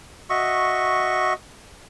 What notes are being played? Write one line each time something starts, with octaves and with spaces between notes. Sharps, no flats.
F#4 D#5 E5 C#6